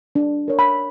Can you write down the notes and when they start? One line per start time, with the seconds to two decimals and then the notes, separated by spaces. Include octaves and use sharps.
0.15 D4
0.48 A#4 C#5
0.59 B5